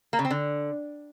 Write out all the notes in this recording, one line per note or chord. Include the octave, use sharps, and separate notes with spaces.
A#3
C#3
C4
D3